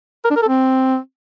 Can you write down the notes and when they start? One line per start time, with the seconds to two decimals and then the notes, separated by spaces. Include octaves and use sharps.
0.25 A#4
0.31 D4
0.36 A#4
0.42 A4
0.48 C4